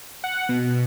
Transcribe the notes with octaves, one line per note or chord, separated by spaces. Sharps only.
F#5
B2